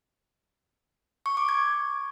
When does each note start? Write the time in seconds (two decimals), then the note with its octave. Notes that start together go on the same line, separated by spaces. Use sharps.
1.26 C#6
1.37 D6
1.49 G#6